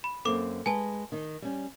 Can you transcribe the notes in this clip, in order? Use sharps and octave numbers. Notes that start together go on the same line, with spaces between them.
B5
F#2 A#3 C4 A4 D6
G#3 B4 G#5 A5
D#3 D#4
G3 C#4